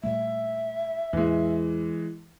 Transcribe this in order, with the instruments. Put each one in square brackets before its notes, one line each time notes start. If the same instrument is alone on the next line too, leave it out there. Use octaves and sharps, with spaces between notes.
[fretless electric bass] A#2 G3 A3 [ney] E5
[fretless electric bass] E2 A2 [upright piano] E3 G#3